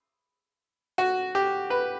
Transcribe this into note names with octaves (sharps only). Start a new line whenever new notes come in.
F#4
G4
B4